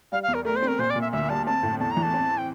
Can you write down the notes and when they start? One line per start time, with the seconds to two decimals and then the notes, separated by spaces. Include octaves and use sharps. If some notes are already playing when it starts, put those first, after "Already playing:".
0.12 G3 F5
0.23 F5
0.28 E2
0.34 A#4
0.45 A3 A#4
0.56 C5
0.62 C4
0.68 A#4
0.79 A#2 C5
0.90 D5
0.96 A#2
1.01 E5
1.12 D2 E5
1.29 G3 A5
1.46 C4 A5
1.63 A2
1.79 E2 A5
1.91 A#5
1.97 E3
2.02 A5
2.14 C4
2.38 G5